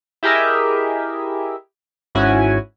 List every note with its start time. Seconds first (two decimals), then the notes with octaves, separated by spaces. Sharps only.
0.23 E4 G4 G#4 A#4 D#5 E5
2.15 G#1 G#2 C#4 E4 F#4 G#5